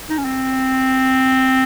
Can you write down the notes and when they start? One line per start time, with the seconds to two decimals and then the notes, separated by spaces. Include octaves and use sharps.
0.09 D#4
0.18 C#4
0.25 C4